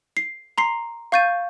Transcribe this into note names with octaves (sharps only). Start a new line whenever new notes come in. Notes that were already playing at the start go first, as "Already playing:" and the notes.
C7
A#5 C6 C7
F5 C#6 G6 A6 D#7